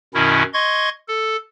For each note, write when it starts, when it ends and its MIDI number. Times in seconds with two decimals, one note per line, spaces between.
0.14 0.43 42
0.14 0.43 47
0.14 0.43 51
0.14 0.43 61
0.14 0.43 64
0.54 0.89 75
0.54 0.89 84
0.54 0.89 85
0.54 0.89 92
1.08 1.36 69